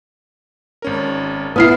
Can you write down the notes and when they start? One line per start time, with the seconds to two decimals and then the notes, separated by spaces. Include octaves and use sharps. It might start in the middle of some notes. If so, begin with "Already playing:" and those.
0.82 G#1 C#4 A#4
1.56 B3 E4 D#6 F6 C7